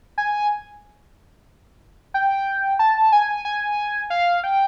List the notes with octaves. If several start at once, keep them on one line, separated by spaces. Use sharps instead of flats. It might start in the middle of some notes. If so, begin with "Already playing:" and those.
G#5
G5
A5
G#5
G#5
F5
G5